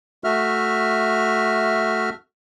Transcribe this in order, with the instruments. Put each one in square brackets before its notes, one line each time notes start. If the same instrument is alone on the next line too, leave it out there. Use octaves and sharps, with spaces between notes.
[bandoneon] A3 F#4 E5 F6